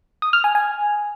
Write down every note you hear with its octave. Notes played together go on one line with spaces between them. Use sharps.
D#6
F6
G#5
G#5